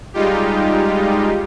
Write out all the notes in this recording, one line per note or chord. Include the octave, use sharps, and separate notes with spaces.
G3 G#3 D#4 F4 G4